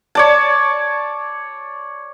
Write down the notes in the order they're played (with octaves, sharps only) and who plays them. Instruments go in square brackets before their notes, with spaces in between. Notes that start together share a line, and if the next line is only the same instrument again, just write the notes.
[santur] C#5 D5 A5